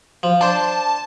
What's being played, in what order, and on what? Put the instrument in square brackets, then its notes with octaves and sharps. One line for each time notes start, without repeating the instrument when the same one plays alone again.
[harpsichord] F3
[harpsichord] D4 C5 [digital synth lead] A5